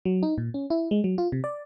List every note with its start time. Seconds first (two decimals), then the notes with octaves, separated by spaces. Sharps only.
0.05 F#3
0.23 D#4
0.38 A#2
0.54 C#4
0.70 E4
0.91 G#3
1.04 F#3
1.18 F4
1.32 C3
1.44 D5